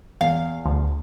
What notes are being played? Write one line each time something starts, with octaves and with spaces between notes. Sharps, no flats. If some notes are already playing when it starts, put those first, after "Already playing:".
E2 F5
D2